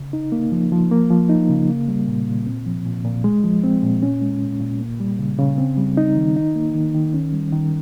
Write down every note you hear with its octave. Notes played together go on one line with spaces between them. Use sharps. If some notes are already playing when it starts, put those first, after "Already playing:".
Already playing: C#3
D#4
A#3
F3
F3
A#3
F3
D#4
C#3
A#3
G3
A#2
A#2
C4
F3
A#2
A#2
G#3
F3
C4
A#2
C#4
G#3
A#2
A#2
A#3
G3
C#3
C#3
C4
G3
D#4
D#3
D#4
A#3
D#3
D#3
C#4
G3
D#3